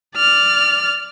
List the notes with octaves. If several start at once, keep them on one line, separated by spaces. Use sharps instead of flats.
D5 F6